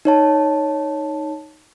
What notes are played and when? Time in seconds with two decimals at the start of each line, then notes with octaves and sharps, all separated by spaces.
0.05 D#4 C#5 A5